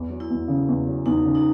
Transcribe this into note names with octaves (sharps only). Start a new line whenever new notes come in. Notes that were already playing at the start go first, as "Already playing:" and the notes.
Already playing: E2
F#3
E4
E2
C#3
E2
F#3
E2 D#4
C#3
D#4